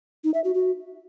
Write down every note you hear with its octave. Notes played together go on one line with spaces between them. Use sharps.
D#4
E5
F#4
F#4